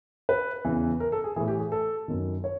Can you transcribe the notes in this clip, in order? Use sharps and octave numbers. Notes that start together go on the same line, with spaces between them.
B4
E2 C#3 E3
A#4
A4
G#4
A2 E3 G#4
G4
G#4
A4
F#2 D#3
C#5